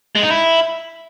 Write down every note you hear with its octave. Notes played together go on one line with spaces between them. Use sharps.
G#3
D#4
E4